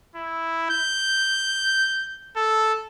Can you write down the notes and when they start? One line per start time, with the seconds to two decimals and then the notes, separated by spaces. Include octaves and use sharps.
0.16 E4
0.70 G6
2.37 A4